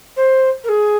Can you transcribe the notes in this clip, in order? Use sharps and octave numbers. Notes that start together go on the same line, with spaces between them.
C5
A#4
G#4